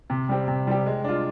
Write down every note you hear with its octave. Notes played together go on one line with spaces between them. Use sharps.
C3
G3 C4 G4
C3
G3 C4 G4
G#3
D4 F4